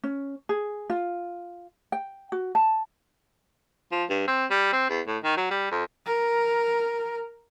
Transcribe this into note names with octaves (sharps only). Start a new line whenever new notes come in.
C#4
G#4
F4
G5
F#4
A5
F3
G2
C4
G3
C4
E2
A2
D#3
F#3
G3
F2
A#4